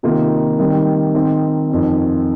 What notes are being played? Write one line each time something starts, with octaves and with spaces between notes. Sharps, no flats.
C3 D#3 A#3 F4
D#3 G3 C4
D#3 C4 D#4
F2 D#3 C4 D#4